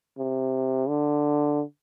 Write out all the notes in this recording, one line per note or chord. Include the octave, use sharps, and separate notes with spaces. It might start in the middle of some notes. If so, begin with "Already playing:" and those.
C3
D3